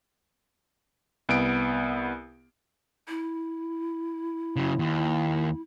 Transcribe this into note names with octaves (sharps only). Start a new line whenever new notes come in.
C2 B3 D7
E4
C#3 F#3
D#2